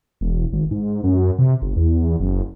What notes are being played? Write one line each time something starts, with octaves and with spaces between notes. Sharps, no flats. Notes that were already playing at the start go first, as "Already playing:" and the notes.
E1
G#1
G#2
F#2
C3
G1
E2
F#1